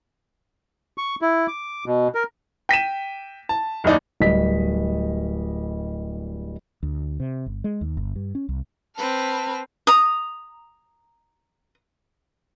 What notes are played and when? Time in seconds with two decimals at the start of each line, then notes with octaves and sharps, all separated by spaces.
0.98 C#6
1.22 E4
1.48 D6
1.86 B2
2.15 A#4
2.69 G5 B6 D#7 E7
3.49 A5
3.84 F#1 D#2 D#4 D5
4.20 D1 G3 D#5 B6
6.83 D2
7.20 C3
7.46 G1
7.64 G#3
7.81 D#2
7.97 G1
8.16 G2
8.35 C#4
8.49 C2
8.97 C4 B4 A5 F6
9.87 A#5 D#6